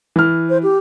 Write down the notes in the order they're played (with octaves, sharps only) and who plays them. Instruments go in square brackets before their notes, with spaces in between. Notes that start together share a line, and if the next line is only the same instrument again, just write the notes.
[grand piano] E3 F6
[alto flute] C5
G4